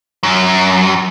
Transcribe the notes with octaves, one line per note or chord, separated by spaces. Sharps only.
F#2